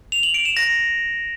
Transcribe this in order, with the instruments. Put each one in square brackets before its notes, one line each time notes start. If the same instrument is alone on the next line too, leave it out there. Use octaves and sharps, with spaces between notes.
[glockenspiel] F7
F#7
D7
E7
A#6